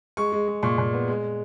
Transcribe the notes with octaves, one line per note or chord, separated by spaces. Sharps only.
G#3 C#6
G#3
G#3
A#2 C#6
A#2
B3
G#3